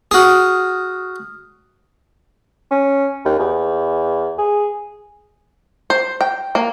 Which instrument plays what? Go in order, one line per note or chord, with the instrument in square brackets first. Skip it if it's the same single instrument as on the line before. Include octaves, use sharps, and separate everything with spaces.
[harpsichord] F#4 G#4 [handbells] D#6 F6
[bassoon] C#4
D#2
E2
G#4
[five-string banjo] C5
G5
A#3